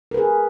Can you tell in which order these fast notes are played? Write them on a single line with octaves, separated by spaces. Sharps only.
A#4 B4 G#4